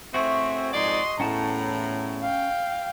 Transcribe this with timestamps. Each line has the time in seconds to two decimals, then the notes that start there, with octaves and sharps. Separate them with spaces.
0.14 A2 C4 F#4 G#4 E5 C#6
0.73 F2 G#2 D5 D#5 C6
1.20 E2 A2 C#4 F#5 A5 A#5
2.22 F5 G5